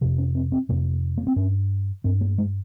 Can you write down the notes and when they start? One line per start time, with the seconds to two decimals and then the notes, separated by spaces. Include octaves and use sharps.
0.01 F2 C3 F3
0.18 C#4
0.35 C4
0.52 C4
0.69 F2 C3 A#3
1.17 A#3
1.27 C4
1.36 G2 C#4
2.04 G2 C4
2.21 A#3
2.38 G#3